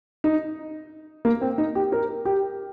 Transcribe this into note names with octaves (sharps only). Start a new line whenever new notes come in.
D#4
A#3
C4
D#4
G4
A#4
G4